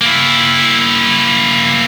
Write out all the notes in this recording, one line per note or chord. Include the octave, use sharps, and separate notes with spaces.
A#3 E4